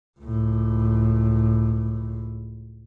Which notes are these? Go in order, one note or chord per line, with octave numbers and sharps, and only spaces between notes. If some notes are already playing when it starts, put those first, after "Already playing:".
C#2 A2